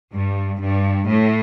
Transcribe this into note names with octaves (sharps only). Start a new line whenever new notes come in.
G2
G2
A2